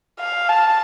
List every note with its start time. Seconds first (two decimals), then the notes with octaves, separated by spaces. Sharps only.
0.20 F5
0.49 A5